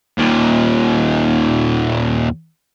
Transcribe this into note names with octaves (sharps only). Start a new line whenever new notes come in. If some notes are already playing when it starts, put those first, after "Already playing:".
D#2 A#2